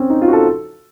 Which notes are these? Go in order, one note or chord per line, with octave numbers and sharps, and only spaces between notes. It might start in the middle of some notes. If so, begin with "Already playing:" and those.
Already playing: C4 C#4
D#4
F4
F#4
A4